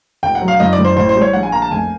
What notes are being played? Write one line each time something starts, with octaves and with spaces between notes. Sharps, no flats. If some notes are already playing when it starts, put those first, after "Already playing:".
E1 G5
F#5
F#3
F5
F#1 D#5
D5
F#1
C5
A1 C5
C5
G3
C#5
A#1 F#5
G#5
A#3 A#5
A5
F1 G#5